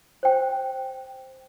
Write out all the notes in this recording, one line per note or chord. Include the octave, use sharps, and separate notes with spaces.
C5 G5